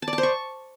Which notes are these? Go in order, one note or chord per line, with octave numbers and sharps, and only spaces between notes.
A5
D5
A5
C5
C#6